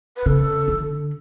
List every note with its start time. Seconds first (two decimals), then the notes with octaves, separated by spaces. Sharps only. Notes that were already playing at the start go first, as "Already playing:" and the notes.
0.16 B4
0.26 C#3 A4
0.68 D3